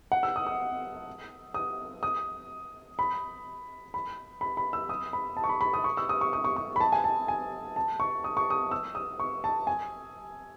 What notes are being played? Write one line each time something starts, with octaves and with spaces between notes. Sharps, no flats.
F#5
E6
D#6
D#6
D#6
D#6
B5
B5
B5
B5
E6
D#6
B5
A5
C#6
B5
B5
D#6
C#6
E6
D#6
C#6
D#6
C#6
C#6
B5
A5
G#5
A5
G#5
A5
C#6
D#6
C#6
D#6
E6
D#6
C#6
A5
G#5